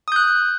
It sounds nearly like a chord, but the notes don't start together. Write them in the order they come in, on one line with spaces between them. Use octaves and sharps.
D#6 G6 F#6